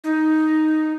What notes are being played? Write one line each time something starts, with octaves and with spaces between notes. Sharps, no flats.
D#4